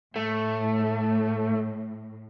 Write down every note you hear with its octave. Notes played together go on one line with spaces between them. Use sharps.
A2 A3